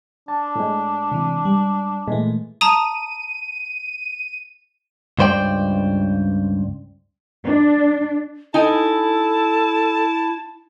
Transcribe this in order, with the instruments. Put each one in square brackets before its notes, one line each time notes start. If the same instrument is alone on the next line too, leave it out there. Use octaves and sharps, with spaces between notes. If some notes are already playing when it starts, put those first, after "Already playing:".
[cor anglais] D4 [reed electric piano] A5
[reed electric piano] A2 G#3
[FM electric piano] C3 E3
G3
[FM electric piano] A#2 A3 [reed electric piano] E3 G#3
[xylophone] A5 A#5 D#6 [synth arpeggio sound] D#7
[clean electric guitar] C#2 G2 C5 D5 G5
[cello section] D4
[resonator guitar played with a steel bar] D#4 G#5 [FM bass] E4 [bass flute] A4 [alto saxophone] A5